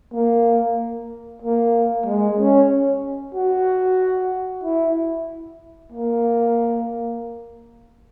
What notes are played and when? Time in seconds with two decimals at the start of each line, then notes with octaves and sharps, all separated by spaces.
0.14 A#3
1.42 A#3
2.06 G#3
2.39 C#4
3.35 F#4
4.64 E4
5.92 A#3